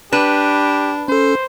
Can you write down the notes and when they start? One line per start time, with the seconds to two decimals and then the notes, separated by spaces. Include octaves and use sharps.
0.13 D4 G4 B4
1.08 C#4 A4 C5